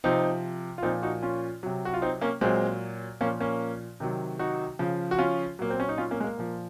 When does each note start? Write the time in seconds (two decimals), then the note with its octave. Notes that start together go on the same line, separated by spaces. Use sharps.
0.04 C3 F3 C4 D#4
0.78 F4
0.83 A#2 F3 C4 D#4
1.03 D#4 F#4
1.23 C#4 F4
1.63 C3 F#3
1.85 F#4
1.94 F4
2.02 C4 D#4
2.21 A#3 C#4
2.41 A#2 F#3 G#3 C4
3.21 A#2 F3 A#3 C#4
3.40 A#3 C#4
4.00 C3 D#3 F#3
4.39 D#4 F#4
4.79 C#3 F3
5.11 F#4
5.18 C#4 F4
5.59 A#2 F#3 A#3
5.70 C4
5.80 C#4
5.89 D#4
5.98 C#4 F4
6.11 A#3 C#4
6.20 G#3
6.24 A#3
6.38 A#2 F3